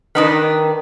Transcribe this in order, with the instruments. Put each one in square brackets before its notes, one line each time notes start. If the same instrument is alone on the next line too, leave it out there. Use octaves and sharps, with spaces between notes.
[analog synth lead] D#3 [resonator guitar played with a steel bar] D4 D#4 B4